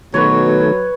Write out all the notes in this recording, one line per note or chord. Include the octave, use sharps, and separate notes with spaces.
B2 D#3 F#3 A3 B4 C#5